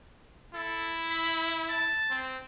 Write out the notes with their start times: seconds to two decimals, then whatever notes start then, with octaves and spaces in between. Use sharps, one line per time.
0.54 E4 A4
1.10 B5
1.69 A5
2.10 C4